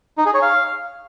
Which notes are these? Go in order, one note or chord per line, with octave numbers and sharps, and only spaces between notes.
D#4
G#4
C#5
F5